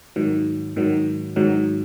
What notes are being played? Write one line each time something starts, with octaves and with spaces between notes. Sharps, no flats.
G#2 D#3 F#3
G#2 D#3 F#3
G#2 D#3 F#3